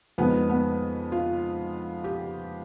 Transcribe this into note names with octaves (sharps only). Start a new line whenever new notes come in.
F2 D#3 G#3 B3
B3
F4
G4